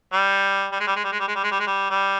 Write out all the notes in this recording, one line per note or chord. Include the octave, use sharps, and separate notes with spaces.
G3
G3
G#3
G3
G#3
G3
G#3
G3
G#3
G3
G#3
G3
G#3
G3
G3